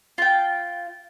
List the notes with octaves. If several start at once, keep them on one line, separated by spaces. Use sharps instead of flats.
F4 G5